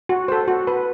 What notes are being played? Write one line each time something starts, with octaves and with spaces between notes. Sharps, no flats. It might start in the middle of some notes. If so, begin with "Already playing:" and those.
F#4
A4 C5
F#4
B4